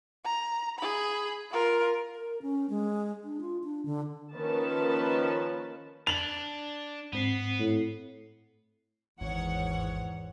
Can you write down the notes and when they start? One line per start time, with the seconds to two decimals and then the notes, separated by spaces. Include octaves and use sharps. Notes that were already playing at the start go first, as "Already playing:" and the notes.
0.25 A#5
0.79 G#4 B5
1.51 F4 A#4
2.16 A#4
2.42 C#4
2.70 G#3
3.24 D4
3.41 F4
3.64 D4
3.86 D3
4.34 D#3 F3 A#3 C#4 B4 A5
6.07 D4 A5 F7 F#7
7.13 G#2 B3 C4 C7
7.60 A2
9.21 G#1 E2 G#2 C#5 F#5